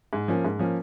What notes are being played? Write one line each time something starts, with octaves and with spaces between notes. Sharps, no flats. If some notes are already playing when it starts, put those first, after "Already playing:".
G#2
F3 A#3 C#4
G#2
F3 A#3 C#4